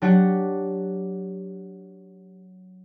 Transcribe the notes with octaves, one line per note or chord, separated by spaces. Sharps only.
F#3 D4 G4 F#5